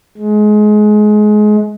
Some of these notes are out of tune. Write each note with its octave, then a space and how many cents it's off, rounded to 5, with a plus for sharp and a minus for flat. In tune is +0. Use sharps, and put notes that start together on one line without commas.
G#3 +25